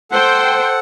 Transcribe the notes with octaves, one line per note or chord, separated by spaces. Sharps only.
A4 C5 F#5 G5